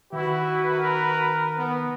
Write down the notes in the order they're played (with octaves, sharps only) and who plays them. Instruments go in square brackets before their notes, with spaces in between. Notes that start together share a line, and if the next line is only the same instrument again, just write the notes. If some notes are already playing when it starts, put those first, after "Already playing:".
[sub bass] D#3 [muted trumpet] E4 [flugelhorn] F#4 [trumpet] B4
[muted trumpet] A#4
[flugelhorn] B3